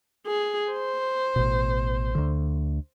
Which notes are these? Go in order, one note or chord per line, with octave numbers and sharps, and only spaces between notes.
G#4
C5
A1 B2
D2 D3